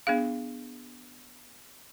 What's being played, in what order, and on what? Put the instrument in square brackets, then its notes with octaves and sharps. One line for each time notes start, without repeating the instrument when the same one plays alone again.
[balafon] B3 D4 G#4 F5